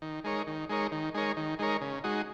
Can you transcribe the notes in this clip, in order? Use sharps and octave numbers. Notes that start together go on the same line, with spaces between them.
D#3
G#3 D#4 A#4 C#5
D#3
G#3 D#4 A#4 C#5
D#3
G#3 D#4 A#4 C#5
D#3
G#3 D#4 A#4 C#5
C#3
G#3 D#4 F#4